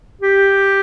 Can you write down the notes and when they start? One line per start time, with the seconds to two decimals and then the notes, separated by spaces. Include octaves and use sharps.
0.21 G4